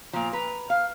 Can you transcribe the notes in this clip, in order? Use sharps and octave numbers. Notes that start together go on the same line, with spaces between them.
A#2 F3 A#5
B4 A#5
F5 F6